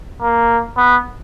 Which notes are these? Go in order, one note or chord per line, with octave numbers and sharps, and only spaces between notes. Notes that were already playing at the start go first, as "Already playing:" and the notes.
A#3
B3